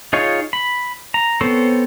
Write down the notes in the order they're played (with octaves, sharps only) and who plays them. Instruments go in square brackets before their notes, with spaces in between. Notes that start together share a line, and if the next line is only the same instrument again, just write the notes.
[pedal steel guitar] D#4 F4 G#4 C#5
B5
A#5
B3 C4 A4 C5 C#5